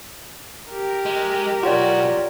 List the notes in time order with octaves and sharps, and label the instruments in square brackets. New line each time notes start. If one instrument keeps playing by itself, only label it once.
[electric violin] G4 A#4
[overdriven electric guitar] G#3
[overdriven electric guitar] B1 F#4 [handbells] F4 C#5 D5